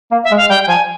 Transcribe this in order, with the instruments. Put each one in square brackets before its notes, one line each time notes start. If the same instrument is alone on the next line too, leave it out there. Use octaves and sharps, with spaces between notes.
[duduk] A#3
[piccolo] E5
[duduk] G#3
[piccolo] F5
[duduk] G3 [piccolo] G5
[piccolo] G5
[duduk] F3 [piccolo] G#5